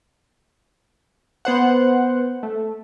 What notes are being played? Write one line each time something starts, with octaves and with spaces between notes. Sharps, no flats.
B3 C5 F#5
A3